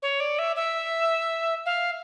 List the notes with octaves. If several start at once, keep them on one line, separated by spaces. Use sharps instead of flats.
C#5
D5
E5
E5
F5